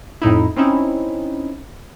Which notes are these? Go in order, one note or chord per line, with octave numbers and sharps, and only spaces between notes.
F2 A2 D#4 E4
C4 C#4 D#4 E4